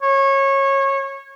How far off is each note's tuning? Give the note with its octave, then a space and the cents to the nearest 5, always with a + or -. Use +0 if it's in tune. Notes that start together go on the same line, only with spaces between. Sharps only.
C#5 -20